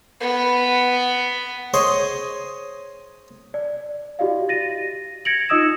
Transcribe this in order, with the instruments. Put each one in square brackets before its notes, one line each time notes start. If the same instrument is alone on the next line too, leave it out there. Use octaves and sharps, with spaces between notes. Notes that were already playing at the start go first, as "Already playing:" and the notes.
[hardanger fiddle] B3
[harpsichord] G#4 C5 C#5 D#5 G#5
[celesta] D5
E4 F#4 G4 D5 D#5 F5
A6 A#6 D#7
G#6 A#6 C#7 D7 F7 F#7
D#4 F4 D#5 D#6 E6 E7